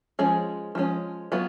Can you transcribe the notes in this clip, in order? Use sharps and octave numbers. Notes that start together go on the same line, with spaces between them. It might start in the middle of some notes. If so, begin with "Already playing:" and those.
F3 G#3 C#4 G#4
F3 G#3 C#4
F#3 B3 F4